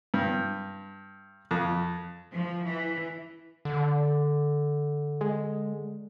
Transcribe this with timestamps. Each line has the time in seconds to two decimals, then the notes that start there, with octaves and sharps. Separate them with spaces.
0.14 G2
1.51 F2
2.33 F3
2.66 E3
3.65 D3
5.21 G#3